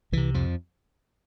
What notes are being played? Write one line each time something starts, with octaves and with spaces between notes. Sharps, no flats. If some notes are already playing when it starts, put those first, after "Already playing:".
C2 C3 E3
F2 F3